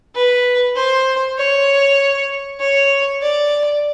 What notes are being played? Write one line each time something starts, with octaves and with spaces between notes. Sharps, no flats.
B4
C5
C#5
C#5
D5